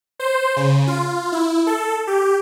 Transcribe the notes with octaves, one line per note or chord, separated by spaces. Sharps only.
C5
C#3
F4
E4
A4
G4